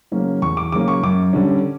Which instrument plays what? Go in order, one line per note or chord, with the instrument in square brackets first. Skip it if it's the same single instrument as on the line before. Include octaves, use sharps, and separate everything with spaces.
[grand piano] C#3 F#3 A#3 C#4
E2 C#6
D6
C#3 F#3 A#3 C#4 D6
C#6
F#2 D6
D3 G3 C#4